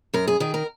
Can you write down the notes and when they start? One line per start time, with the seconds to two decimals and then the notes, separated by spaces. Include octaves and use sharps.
0.14 F#2 A#4
0.28 G#4
0.40 D#3 G#4
0.54 A#4